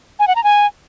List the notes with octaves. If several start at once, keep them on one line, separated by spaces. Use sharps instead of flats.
G#5
F#5
A#5
G#5